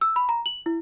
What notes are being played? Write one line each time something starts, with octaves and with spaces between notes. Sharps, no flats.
E6
B5
A#5
F#7
E4